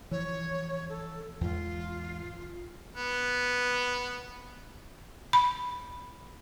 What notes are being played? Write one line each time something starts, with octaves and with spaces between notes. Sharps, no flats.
E3 F3 C#5
A4
E2 G#2 F4
B3
B5